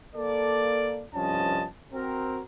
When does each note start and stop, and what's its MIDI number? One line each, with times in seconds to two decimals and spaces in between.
0.15 1.04 58
0.15 1.04 69
0.15 1.04 74
1.13 1.65 36
1.13 1.65 43
1.13 1.65 53
1.13 1.65 61
1.13 1.65 75
1.13 1.65 81
1.92 2.40 60
1.92 2.40 66
1.92 2.40 70